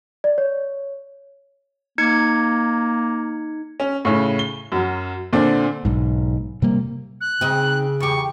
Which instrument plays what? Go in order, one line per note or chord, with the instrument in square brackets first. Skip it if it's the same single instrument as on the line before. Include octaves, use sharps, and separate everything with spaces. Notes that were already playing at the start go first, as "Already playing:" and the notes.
[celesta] D5
C#5
[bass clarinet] A#3 [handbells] D#4 G#6 C#7
[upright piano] C#4
A2 C#3 C#4
G7
F#2 F#3
A#2 D3 C4 D4
[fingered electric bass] B1 G#2
C3 G3 A#3
[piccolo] F#6
[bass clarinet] C#3 [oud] C4 D#4
[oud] E2 G4 [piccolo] C#6